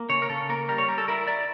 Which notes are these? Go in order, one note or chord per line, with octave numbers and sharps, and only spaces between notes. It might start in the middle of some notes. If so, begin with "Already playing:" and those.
Already playing: A#3
C#3 C#5
A#4
C#3 A4
A#3 A#4
G3 A#4
C#5
G3 A#4
A4
E4 A#4
E4 D5